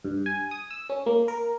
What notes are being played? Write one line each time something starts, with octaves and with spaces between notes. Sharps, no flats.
G2
G#5
D#6
E6
C#4
A#3
A#4